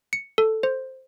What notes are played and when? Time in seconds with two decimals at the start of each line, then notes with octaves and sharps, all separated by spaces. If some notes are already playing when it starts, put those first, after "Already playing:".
0.13 C#7
0.38 A4
0.63 C5